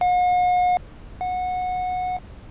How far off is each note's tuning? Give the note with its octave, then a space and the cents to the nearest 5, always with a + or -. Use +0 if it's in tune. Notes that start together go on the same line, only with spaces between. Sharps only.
F#5 -45
F#5 -20